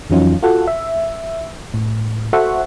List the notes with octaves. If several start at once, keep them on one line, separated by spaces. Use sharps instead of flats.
F2 E3 F#3 C#4 D#4 F4
F4 F#4 A4 F#5
E5
A2
F#4 A4 C5 E5 F#5 C#6